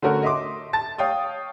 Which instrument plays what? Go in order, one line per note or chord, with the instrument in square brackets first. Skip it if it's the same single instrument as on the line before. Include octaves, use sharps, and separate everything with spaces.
[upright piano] D3 A3 C#4 F#4 A#4
D#5 E5 C6 D6
A5 A6
C#5 F5 G5 D#6